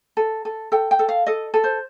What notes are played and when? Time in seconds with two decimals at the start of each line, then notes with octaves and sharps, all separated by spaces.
0.17 A4
0.45 A4
0.72 A4 G5
0.91 G5
0.99 A4
1.08 F5
1.26 A4 D#5
1.54 A4
1.64 C5